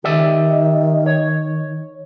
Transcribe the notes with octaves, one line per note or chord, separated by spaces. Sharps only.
D#3 G4 D5 E5
C#5